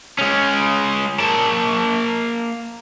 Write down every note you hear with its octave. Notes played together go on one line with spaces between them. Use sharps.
G#3 C#4
A#3 A5